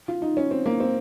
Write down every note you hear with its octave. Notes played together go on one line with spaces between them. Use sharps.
F4
D#4
C#4
C4
A#3
C4